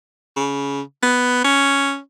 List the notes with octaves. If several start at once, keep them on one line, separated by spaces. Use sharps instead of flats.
C#3
B3
C#4